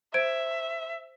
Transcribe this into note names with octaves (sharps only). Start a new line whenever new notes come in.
C5 E5 G#6 D7